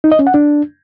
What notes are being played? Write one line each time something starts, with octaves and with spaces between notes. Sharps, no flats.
D#4
D#5
C#4
F#5
D4